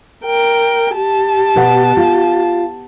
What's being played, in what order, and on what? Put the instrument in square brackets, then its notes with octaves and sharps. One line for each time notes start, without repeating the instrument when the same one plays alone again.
[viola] A#4 G5
G4 A5
[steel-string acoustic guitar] B2 B4 F#5
F4